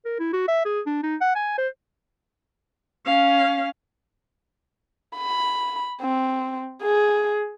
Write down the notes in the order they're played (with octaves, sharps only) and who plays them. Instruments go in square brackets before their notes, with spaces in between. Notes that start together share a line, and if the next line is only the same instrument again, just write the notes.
[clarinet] A#4
E4
F#4
E5
G#4
D4
D#4
F#5
G#5
C5
[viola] C#4 F5
[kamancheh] B5
C4
G#4